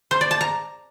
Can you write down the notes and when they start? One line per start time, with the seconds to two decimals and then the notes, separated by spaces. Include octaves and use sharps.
0.11 C5
0.21 D5
0.31 A5
0.41 A#5